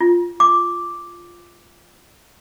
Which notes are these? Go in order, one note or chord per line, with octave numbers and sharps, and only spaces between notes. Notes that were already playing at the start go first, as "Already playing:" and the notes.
F4
D6